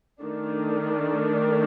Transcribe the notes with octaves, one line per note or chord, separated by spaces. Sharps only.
D#3 A3 D4